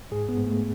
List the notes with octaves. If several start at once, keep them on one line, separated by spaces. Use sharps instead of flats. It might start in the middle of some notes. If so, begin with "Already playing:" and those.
G#2 G#4
B3
G#2
A3